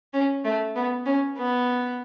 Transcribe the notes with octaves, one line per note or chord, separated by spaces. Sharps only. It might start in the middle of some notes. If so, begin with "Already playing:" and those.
C#4
A3
B3
C#4
B3